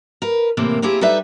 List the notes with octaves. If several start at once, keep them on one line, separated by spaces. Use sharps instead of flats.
A#4 B4
A2 C3 E3 A#3 C4
A#3 C4 E4 G4 G#4
G3 D#4 A4 B4 E5